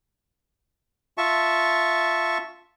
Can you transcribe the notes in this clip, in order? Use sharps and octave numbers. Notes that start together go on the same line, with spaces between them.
F4 E5 A5 C#6